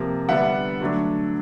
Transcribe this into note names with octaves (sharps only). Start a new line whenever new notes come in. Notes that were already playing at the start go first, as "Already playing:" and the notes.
Already playing: C3 F3 A#3
D3 G3 B3 D4 E5 F#5
D3 F#3 A3 D4